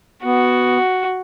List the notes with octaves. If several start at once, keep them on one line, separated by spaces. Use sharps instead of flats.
B3 F#4